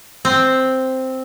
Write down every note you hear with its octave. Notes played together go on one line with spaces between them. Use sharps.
C4